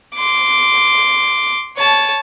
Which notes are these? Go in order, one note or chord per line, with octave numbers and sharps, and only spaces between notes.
C6 D6
C#5 A5